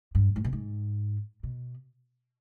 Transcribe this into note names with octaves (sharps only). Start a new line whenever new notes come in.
G2
G#2
B2
G#2
B2